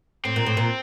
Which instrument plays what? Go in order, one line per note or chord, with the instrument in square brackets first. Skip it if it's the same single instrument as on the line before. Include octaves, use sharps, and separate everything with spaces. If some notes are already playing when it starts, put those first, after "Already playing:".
[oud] A2 [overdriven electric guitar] C4
[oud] A#2
A2
A#2